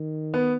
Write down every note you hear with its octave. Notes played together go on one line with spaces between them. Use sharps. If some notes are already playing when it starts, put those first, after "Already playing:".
Already playing: D#3
B3